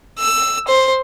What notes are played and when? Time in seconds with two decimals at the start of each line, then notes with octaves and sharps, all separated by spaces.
0.19 E6
0.68 C5